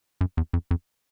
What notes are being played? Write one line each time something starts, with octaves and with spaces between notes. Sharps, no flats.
F#2
E2
F2
F2